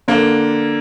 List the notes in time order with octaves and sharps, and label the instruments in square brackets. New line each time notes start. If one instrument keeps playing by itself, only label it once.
[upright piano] D3 A#3